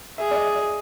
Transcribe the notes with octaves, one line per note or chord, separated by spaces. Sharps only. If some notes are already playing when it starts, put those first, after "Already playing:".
G#4 E5
D5
D#5
D5